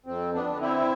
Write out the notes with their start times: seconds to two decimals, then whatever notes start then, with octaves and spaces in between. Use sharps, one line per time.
0.06 F2 C4
0.34 B3 D4
0.48 D3
0.60 C4 E4